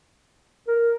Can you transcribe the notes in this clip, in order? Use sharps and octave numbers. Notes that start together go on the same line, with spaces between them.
A#4